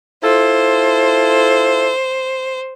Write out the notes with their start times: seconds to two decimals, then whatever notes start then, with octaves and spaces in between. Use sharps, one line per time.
0.23 E4 F4 A4 C5